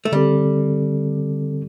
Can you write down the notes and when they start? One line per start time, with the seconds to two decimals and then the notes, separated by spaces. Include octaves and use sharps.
0.05 A3
0.12 D3 G3 C4 A4